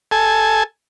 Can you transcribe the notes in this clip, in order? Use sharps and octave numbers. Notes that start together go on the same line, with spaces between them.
A4 G#5